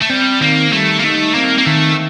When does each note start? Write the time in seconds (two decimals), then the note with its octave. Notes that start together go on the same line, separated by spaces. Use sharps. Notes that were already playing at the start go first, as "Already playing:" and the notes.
0.02 A3
0.10 G3 C4
0.41 D#3 A#3
0.72 G3 A3
0.99 A#3
1.04 A3 D#4
1.34 A#3 C4
1.58 A#3
1.66 D#3 A3